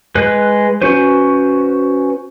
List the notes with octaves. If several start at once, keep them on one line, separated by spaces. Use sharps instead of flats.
G#3 B4 F#6
C#4 F#4 B4 C5